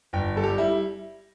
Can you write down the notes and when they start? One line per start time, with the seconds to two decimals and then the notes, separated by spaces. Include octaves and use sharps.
0.13 G1 G5
0.36 G3 A4
0.43 G4
0.58 G3 E4